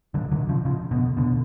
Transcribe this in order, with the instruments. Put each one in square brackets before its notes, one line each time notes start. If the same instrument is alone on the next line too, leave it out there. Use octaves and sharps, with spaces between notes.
[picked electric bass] D3 F#3
D3 F#3
C#3 F3
C#3 F3
B2 D3
B2 D3